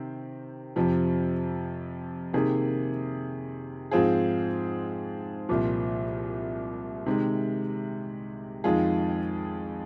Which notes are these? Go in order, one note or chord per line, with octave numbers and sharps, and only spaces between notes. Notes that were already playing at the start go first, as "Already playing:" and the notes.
Already playing: C3 D#3 C4
F2 C3 F3
C3 D#3 A#3 G#4
G#2 F3 C4 F4 G#4
C2 A#2 F3
C3 D#3 G#3
F2 D#3 G#3 F4 G#4